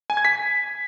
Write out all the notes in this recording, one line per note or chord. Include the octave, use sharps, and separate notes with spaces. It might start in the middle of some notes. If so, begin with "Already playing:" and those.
G#5
G#6
B6